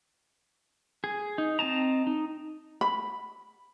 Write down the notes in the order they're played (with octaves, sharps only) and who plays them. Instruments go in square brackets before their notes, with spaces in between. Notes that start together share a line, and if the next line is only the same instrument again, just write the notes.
[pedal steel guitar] G#4
D#4
C4 D#5 A5 A#5
D#4
[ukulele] B5